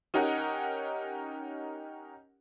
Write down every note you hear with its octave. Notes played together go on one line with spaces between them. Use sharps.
C#4 D#4 G4 A#4 D#5 F#5